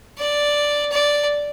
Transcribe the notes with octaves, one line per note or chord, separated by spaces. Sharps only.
D5
D5